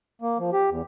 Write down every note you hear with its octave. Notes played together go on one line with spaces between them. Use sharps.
A#3
F3
G4
E2